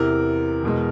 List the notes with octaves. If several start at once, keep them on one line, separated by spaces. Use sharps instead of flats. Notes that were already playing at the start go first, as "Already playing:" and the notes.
Already playing: E2 C3 E3 A#4
E2 B2 G#3